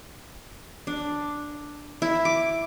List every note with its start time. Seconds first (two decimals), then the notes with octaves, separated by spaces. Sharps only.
0.87 D4
2.02 E4
2.25 D6